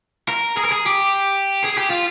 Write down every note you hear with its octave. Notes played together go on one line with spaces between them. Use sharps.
A#4
G#4
A#4
G#4
G4
G#4
G4
F4